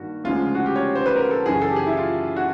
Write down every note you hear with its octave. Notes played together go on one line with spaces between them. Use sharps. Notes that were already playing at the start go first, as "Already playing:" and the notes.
Already playing: G2 D#3 A#3 F#4
D2 C#3 F3 G#3 F4
F#4
G4
C#5
C5
B4
A#4
A4
F#2 C#3 E3 G#4
A4
G4
G#4
E4
F4
F#4